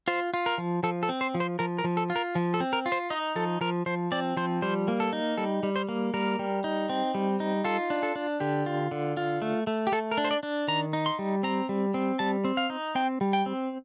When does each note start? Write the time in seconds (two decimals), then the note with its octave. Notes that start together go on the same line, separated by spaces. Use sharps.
0.08 F4 C5
0.34 F4
0.46 A#4
0.58 F3
0.83 F3 A4
1.03 A4
1.09 C4
1.21 C5
1.35 F3
1.40 C5
1.59 F3 A#4
1.78 A#4
1.84 F3
1.97 A4
2.10 F4
2.16 A#4
2.35 F3
2.54 A4
2.60 C4
2.73 A#4
2.86 F4
2.92 C5
3.10 D#4 D#5
3.36 F3 A4
3.61 F3 A#4
3.86 F3 C5
4.12 C4 D5
4.37 F3 C5
4.62 G3 C5
4.88 A#3
5.00 A4
5.13 D#4
5.37 G3 A4
5.63 G3
5.76 C5
5.89 A#3
6.14 G3 A#4
6.39 G3
6.64 D#4
6.89 C4
7.15 G3
7.40 D#4
7.64 F4 A4
7.90 D4
8.03 A4
8.16 D4
8.40 D3 G4
8.66 F4
8.91 D3
9.17 F4
9.42 A3
9.67 A3
9.87 G4
9.92 A3 A4
10.11 A#4
10.18 D4
10.24 C5
10.31 D5
10.43 D4
10.68 D#3 A#5
10.93 D#4
11.06 C6
11.19 G3
11.43 C4 A#5
11.69 G3
11.94 C4
12.19 G3 A5
12.44 C4
12.57 F5
12.70 D#4
12.95 C4 G5
13.21 G3
13.33 G5
13.46 C4